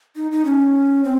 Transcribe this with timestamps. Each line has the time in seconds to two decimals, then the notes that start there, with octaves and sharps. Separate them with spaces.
0.16 D#4
0.32 D#4
0.45 C#4
1.04 C4